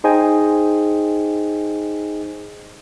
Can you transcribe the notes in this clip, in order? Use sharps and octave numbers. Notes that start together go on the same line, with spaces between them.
D#4 G#4 C5 D#5 G5 G#5